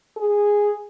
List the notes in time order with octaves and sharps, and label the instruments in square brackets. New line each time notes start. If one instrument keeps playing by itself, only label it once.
[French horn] G#4